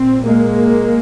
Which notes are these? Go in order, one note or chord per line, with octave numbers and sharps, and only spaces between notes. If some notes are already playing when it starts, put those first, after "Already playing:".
Already playing: A#2 C4
G#3 A#3